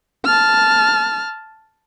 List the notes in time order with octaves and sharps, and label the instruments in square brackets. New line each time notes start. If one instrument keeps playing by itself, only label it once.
[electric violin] A5 F6